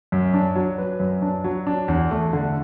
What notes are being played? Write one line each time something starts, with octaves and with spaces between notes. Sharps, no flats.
F#2
D4
F#3
B4
F#2
D4
F#3
D4
E2
A3
D3